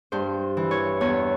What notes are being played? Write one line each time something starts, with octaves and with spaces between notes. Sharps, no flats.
G2 C5
E3
C#5
E2 C#5